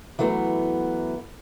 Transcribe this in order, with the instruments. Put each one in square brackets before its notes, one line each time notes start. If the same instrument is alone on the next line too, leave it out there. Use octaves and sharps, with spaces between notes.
[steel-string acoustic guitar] E3 F#3 A3 B3